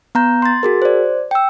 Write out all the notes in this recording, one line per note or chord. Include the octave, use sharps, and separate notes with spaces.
B3 A#5 G6
C6 A6
F#4 G#4 A#4
C5 D5
G5 E6